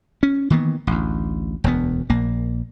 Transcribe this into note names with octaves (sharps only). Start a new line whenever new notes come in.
C#4
D#3 E3 A#3 B3
A1 D2
E1 D2 G#3 B3
A#1 A#3